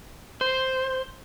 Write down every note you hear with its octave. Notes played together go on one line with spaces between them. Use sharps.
C5